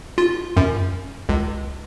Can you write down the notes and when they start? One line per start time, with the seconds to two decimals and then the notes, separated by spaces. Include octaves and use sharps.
0.18 F4
0.57 F#2
1.29 C#2